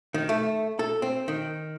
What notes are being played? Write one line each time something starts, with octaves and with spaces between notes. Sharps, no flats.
D#3
A3
A4
C4
D#3